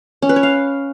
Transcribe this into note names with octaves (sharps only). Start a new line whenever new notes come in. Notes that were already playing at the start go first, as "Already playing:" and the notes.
C#4
B4
C#5
F5